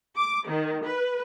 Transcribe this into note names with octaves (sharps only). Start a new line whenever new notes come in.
D6
D#3
B4